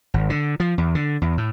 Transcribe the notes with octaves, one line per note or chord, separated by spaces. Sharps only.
G#1
D3
F3
E2
D3
E2
A2